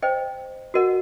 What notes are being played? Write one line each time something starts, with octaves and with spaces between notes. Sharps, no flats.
C5 D#5 G5
F#4 A#4 D#5 F#5